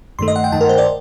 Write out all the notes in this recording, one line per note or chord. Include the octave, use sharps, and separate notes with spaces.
G2 D#3 A3 C6
D#5
F#5
G5
G2 D#3 A3 A5
A#4
C5
D5